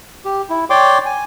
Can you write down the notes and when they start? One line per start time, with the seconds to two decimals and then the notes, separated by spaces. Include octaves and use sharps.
0.25 G4
0.50 E4
0.70 C#5 D5 G5 C6 D6
1.06 G#5